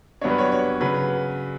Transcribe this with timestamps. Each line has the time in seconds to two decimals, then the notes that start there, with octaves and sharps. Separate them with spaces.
0.21 G2 F#3 B3 D4 C#5
0.30 B4
0.38 C#5
0.52 C#5
0.81 C#3 F#3 B4